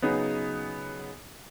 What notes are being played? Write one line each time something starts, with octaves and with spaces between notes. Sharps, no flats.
C#3 F#3 B3 D#4 G#4